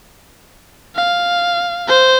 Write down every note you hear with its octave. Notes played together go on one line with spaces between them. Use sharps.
F5
C5